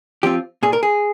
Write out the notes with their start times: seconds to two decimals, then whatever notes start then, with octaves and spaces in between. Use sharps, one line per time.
0.23 F3 C4 F4 G4
0.63 A#2 G#4
0.73 A#4
0.83 G#4